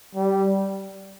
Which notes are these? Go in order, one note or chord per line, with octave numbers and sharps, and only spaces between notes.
G3